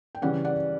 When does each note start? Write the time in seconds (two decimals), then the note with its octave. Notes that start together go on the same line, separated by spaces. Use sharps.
0.15 G5
0.22 C#3 E3 G3 C#4 D5 F#5
0.45 D5 F#5